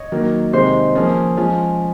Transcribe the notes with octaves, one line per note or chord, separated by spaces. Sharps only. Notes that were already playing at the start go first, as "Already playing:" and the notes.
Already playing: C#5 D#5
D#3 F#3 A#3
C3 D#3 G#3 D#4 C5
F3 A#3 C#4 G#4
F3 G#3 C#4 F4